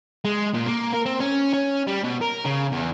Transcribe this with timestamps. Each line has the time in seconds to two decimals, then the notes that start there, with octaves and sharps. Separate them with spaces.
0.25 G#3
0.54 A#2
0.67 A#3
0.93 A#4
1.06 C4
1.20 C#4
1.53 C#4
1.87 G3
2.04 B2
2.21 A#4
2.45 C#3
2.72 E2